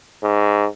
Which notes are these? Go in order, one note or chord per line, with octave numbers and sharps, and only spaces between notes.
G#2